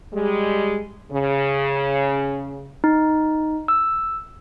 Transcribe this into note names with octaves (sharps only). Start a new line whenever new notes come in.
G3 G#3
C#3
D#4
E6